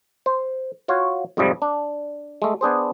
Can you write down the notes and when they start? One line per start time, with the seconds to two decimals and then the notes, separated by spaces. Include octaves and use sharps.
0.26 C5
0.88 F4 F#4 C#5 F5
1.37 F2 G#2 C3 F3 G3
1.62 D4
2.42 G#3 A3
2.61 B3 D4 G#4 C5